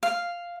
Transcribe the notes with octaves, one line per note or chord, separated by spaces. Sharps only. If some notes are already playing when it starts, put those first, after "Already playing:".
F5